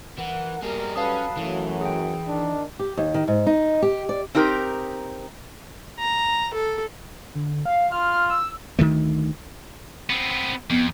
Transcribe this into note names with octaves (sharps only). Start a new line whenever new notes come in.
E3 A#4 F#5
B2 G3 A#3 G#4 A#4
F#3 C#4 A4 B4 F5 A5 D#6
F#2 E3 F#3 A3
G#4 G5
D#3 D4
G4
D#2
D#3
G#2
D#4
G4
D5
C4 D#4 G4 A#4
A#5
A4
D3
F5
F4 F6
E6
D2 D#3 G3 A3
B3 C4
F2 B3